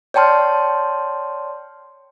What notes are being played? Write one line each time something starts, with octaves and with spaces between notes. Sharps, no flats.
C#5 D5 G5 A5 C6 F6